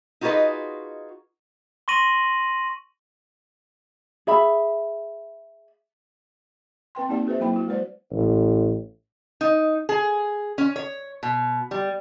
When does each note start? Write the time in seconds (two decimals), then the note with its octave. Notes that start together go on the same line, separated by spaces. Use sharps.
0.21 D#4 F4 F#4 G#4 B4 D#5
1.88 C6 C#6 A#6 D#7 F#7
4.27 G#4 E5 B5
6.95 C4 B4 G5 C6
7.09 A#3 C4 D#4 G4 D5 F#5
7.27 F#4 G#4 B4 C5 E5
7.40 F#3 A#3 E4 G5 B5
7.53 E4 F#4
7.68 G#3 B4 C5 D5
8.12 A1
9.41 D#4
9.89 G#4
10.58 C#4
10.76 C#5
11.23 B2
11.71 G3